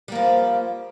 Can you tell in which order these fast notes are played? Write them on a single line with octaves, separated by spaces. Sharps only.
G3 A#3 F3